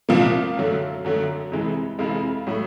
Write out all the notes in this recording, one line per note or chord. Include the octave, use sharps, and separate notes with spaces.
C2 A#2 F3 A#3 F5
F#2 D3 F#3 A3
F#2 D3 F#3 A3
F2 C3 E3 G#3
F2 C3 E3 G#3 F5
A2 F#3 A3